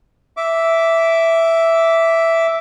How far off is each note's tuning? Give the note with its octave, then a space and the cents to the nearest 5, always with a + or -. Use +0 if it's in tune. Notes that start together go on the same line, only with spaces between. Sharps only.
E5 +0 D6 -15